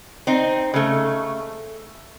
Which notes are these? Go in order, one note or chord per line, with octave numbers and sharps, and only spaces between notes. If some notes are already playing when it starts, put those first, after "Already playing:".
C4 D#4
C#3 A3